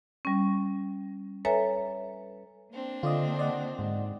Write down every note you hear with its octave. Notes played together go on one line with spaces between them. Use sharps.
G3 C#4
A4 B4 C#5 E5 G#5 A#5
A#3 C4 D4
D3 F4 D5 D#5
D5 D#5 F#5
G#2